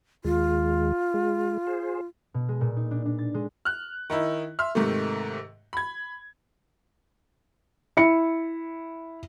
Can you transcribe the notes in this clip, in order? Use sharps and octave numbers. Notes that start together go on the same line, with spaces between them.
D#2 G#3 F4
G#3
G#4 C5
B2
G#3
A#2
D#4
D4
D4
A6
G#3
F6 F#6
D#3 D#4 E4
E5 C6 F6
G#2 C3 D#3 A3
B5 G#6
E4 C#7